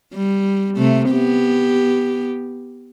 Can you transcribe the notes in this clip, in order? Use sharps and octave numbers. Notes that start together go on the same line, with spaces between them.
G3
C3 A3
B3 G4